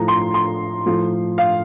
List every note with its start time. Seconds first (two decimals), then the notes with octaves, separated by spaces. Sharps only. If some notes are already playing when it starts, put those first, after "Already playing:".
Already playing: A2 F3 A#5
0.08 C6
0.34 C6
0.86 A2 F3
1.38 F5